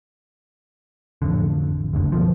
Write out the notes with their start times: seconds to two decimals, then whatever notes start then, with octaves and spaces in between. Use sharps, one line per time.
1.22 A1 F2 D3
1.93 F#1 D2 D3
2.12 B1 B2 F3